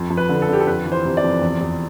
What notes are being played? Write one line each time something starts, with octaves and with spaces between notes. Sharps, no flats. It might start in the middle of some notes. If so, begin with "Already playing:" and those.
Already playing: F2
F2
B4
D3
A4
D3 G4
A4
F2 B4
E3
C5
C3
D5
F2
E2
E2